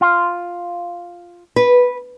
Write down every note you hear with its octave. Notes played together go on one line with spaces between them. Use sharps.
F4
B4